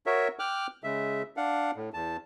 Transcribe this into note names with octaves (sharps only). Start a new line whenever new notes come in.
F#4 A#4 C#5 E5
G5 D6 F6 F#6
C#3 G#3 E5
D4 F5 F#5
A2
E2 A5